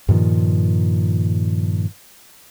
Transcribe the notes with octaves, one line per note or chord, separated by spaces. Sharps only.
G2 A#2 D#3 F3